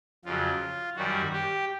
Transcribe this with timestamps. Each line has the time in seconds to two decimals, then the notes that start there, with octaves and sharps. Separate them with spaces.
0.25 F2 C#3 F#3 F4
0.96 F#2 D#3 G3 F#4
1.33 G4